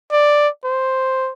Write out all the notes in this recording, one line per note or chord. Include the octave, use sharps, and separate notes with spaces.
D5
C5